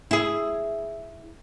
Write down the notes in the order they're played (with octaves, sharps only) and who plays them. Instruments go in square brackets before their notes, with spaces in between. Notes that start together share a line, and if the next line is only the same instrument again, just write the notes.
[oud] E4 G#4